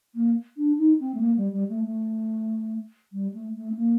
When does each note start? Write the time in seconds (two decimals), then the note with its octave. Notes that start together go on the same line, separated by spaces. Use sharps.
0.15 A#3
0.57 D4
0.78 D#4
1.00 C4
1.14 A3
1.21 A#3
1.37 G3
1.53 G3
1.69 A3
1.84 A3
3.13 G3
3.34 A3
3.55 A3
3.72 C4
3.76 A#3